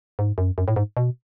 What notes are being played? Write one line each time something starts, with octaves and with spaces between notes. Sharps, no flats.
G#2
F#2
F#2
A2
G#2
B2